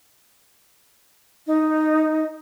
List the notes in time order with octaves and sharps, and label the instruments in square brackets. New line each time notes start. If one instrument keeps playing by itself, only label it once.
[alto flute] D#4